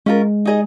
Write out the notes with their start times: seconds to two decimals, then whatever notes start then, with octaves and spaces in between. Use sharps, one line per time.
0.06 G#3 C#4 F4 A#4
0.45 D#4 G#4 D#5